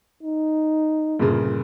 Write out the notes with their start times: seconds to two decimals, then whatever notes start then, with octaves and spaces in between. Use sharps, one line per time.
0.23 D#4
1.19 G1 A#2 C#3